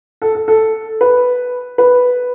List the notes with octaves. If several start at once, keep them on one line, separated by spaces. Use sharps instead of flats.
A4
A4
A4
B4
B4